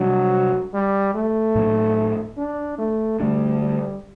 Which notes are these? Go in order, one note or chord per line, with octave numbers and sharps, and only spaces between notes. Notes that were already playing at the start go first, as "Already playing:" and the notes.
Already playing: C3 F#3 G3 D4
G3
A3
A2 F#3 A#3
D4
A3
D3 G3 A3 D4
G3